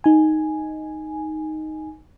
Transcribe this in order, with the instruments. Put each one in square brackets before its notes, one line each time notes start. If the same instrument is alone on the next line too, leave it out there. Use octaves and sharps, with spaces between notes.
[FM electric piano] D#4 G#5